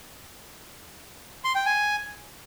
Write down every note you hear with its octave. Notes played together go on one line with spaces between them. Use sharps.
C6
G5
G#5